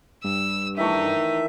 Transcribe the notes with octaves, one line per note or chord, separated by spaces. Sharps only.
G2 E6
D#3 E3 A3 D#4 E5